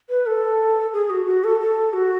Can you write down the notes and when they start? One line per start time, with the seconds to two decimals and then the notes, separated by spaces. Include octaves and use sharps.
0.10 B4
0.26 A4
0.93 G#4
1.10 F#4
1.26 F#4
1.44 A4
1.60 A4
1.93 F#4